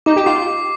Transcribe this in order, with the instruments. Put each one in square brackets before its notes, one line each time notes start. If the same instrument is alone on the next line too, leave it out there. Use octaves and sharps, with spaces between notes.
[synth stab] D#4 [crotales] D6
[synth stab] G4
[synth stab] F4 [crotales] C7